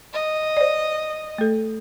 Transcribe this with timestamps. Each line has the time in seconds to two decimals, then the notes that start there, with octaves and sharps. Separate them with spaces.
0.13 D#5
0.57 C5 D5
1.38 A3 A4